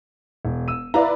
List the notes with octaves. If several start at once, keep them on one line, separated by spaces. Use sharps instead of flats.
E1
E6 D#7
E4 B4 D5 E5 F5 A#5